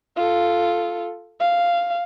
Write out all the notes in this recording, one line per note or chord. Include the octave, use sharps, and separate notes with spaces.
F4 A4
F5